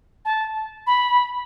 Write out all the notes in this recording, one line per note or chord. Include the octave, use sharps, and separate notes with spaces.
A5
B5